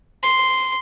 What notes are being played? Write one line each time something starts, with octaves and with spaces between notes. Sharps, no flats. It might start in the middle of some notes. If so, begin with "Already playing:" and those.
C6